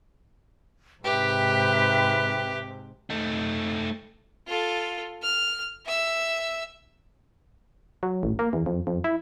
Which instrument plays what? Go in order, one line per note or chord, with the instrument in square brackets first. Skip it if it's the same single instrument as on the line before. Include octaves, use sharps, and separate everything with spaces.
[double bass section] G#2 C3 [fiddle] G4 [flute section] B4 E5 G5
[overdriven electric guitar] A3 D#4
[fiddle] F4 A4
F6
E5 E6
[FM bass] F#3
A1
A#3
E2
F2
F2
E4